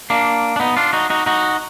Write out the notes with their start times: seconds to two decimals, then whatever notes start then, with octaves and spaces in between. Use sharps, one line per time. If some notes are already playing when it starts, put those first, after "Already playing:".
0.10 A#3 D4
0.56 D4
0.60 B3 D#4
0.77 D4 F4
0.93 D#4 F#4
1.10 D#4 F#4
1.26 D#4 F#4